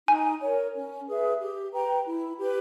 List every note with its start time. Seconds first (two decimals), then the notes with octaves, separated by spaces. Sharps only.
0.08 D#4 G#5
0.41 A#4 C#5
0.75 C#4
1.07 G#4 B4 E5
1.40 G4
1.72 B4 G5 A#5
2.05 E4
2.38 G4 B4